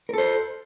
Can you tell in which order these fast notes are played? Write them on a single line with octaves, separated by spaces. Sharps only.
A#4 A4 C5